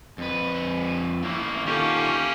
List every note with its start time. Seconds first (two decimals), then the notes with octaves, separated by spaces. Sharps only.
0.18 F2 B4
1.23 A3 A#3 C#4 E4
1.65 D#3 A#3 C#4 F4 G4 A4 C#6 G6